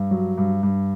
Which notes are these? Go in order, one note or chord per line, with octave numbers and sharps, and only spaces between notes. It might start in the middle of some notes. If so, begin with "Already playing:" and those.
Already playing: G2
F#3
G2
G2